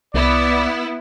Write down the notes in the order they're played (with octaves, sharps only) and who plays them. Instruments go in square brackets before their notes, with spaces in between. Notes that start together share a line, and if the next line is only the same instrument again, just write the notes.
[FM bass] C2 [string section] B3 E4 [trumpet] D5